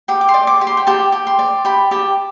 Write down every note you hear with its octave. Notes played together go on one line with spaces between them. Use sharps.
G4 G5
D6
C6
D5
D6
G4
C6
G5
G4 A5
G4
C6
D5
G4 B5
G4 A5